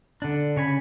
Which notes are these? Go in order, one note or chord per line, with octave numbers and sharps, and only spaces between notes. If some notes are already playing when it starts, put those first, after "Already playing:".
D3 D4
C#3 C#5 G#5 B5